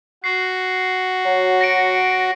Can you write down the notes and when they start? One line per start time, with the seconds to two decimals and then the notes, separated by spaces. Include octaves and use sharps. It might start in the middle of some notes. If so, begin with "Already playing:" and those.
0.24 F#4 C7
1.26 F#3
1.61 A#6 C#7 D7